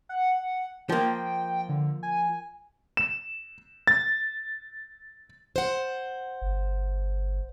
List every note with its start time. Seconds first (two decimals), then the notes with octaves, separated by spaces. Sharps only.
0.09 F#5
0.89 F3 A#3 G5
1.69 D3
2.03 G#5
2.97 E7
3.87 A6
5.56 C5 F#5
6.42 G1